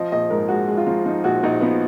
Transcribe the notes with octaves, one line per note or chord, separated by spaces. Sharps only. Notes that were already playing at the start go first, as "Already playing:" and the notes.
Already playing: F3 D#5
A#1 D#5
G#2 A#4
G#3 F#4
G#3
F4
F3
F3 D#4
A#1 F#4
A#1 D#4
F3 B3